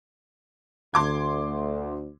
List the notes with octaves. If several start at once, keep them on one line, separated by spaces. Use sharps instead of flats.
D2 C6 D6 G#6